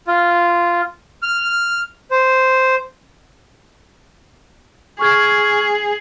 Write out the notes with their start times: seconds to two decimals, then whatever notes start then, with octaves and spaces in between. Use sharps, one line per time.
0.07 F4
1.22 F6
2.11 C5
4.99 G#4 C#6 F6 G#6